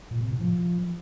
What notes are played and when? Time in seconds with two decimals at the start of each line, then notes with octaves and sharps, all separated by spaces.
0.11 A#2
0.21 C3
0.31 A2
0.40 F3